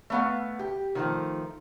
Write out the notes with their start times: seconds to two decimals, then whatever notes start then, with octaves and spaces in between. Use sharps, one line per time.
0.10 A3 B3 F5
0.59 G4
0.95 D#3 F3 A3